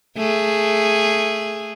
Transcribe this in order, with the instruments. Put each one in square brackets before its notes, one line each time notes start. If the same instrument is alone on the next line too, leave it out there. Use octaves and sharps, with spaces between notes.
[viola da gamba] A3 G#4